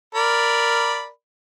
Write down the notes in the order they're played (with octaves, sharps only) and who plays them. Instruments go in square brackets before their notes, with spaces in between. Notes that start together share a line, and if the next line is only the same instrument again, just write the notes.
[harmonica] A#4 D5 B5